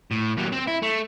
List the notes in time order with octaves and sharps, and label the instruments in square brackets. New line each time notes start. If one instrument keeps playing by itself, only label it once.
[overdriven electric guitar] A2
D#2 F#3
C4
E4
A3